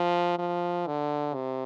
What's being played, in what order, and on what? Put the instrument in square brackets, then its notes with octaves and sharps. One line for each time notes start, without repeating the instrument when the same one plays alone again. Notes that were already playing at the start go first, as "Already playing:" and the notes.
Already playing: [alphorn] F3
F3
D3
C3